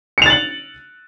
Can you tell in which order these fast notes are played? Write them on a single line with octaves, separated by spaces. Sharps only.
C#7 F7 A6 F#7